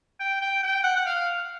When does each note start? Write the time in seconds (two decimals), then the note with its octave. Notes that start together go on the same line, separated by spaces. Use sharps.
0.19 G5
0.41 G5
0.63 G5
0.84 F#5
0.96 F#5
1.06 F5